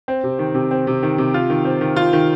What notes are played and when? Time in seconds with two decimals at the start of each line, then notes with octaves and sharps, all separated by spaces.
0.08 C4
0.24 C3
0.39 D#3
0.54 C3
0.71 C4
0.87 C3
1.03 D#3
1.18 C3
1.34 F4
1.50 D#3
1.65 C4
1.81 D#3
1.96 F4
2.13 D#3